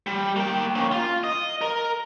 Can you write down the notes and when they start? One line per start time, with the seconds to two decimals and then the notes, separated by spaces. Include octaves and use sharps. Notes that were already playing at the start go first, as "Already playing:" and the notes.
0.07 G3
0.36 A#3 G5
0.76 A#3 C#4
0.92 F4
1.24 D#5
1.61 A#4